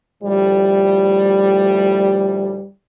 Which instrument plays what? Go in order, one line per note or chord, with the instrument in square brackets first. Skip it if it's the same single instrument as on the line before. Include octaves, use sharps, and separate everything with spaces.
[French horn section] D2 A2 F3 G3